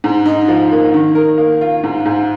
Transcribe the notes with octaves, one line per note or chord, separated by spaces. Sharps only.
G#2
D#4
F3
A#3
D#3
A#4
A#3
F4
G#2
G#2